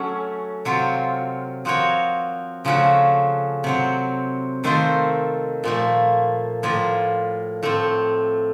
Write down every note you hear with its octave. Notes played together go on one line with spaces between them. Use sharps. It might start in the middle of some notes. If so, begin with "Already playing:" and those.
Already playing: F#3 A3 C#4
C3 F#3 C4 F4
F3 C4 F#4 A#4 C#5
C#3 F3 A3 C#4 F#4
C3 F#3 C4
D#3 A3 C4 F4 C5
A#2 F3 A3
A2 F3 A#3 F4
A2 A3 C4